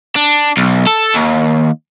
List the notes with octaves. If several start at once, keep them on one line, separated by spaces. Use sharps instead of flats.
D4
B1
A4
D#2